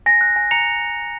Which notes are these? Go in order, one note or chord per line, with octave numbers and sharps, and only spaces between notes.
G#5 A#6
F#6
G#5
A#5 C#7 F7